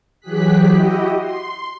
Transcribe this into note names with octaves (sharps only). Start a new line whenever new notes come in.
E3 F#3 G4 G#4 F#6 B6
E4 F#4 G4 D#5
C6